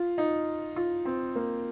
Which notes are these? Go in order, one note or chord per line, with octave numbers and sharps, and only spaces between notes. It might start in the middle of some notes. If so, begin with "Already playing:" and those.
Already playing: F4
D#4
F4
C4
A#3